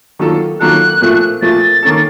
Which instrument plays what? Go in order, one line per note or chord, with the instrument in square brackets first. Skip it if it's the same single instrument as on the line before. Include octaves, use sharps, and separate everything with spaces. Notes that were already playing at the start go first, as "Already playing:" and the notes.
[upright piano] D#3 F#3 A#3 F4 A4
[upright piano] D#3 F#3 A#3 F4 A4 [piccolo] F#6
[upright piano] A#2 F3 A3
[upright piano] A#2 F3 A3 [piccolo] A6
[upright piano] D#3 A#3 C#4 A4